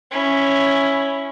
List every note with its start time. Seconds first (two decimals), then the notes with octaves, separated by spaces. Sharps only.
0.11 C#4 E4